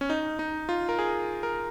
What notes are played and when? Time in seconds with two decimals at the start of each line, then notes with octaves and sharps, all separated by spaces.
0.01 C#4
0.10 D#4
0.39 D#4
0.69 F4
0.89 A#4
0.99 G#4
1.43 A#4